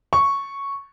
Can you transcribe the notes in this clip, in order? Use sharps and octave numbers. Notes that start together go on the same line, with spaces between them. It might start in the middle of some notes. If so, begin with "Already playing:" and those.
C#6